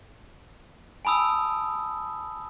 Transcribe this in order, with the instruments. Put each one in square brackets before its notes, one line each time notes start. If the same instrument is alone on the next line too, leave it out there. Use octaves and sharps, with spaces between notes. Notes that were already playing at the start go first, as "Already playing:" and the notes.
[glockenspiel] G#5 A5 B5 D#6 E6